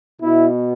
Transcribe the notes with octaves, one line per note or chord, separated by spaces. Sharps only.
B2 E4